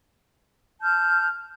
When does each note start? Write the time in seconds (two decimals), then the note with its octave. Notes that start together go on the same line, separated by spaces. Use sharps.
0.81 A5 F6 G6